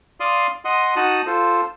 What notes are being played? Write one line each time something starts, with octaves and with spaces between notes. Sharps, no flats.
D5 F5 C6 D#6
D#5 F#5 C6 D#6
D#4 F#4 F#5 A5 D#6 F#6
F4 A4 C5